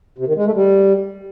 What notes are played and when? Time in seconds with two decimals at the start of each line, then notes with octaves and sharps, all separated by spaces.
0.18 C3
0.27 D#3
0.36 G#3
0.46 A3
0.55 G3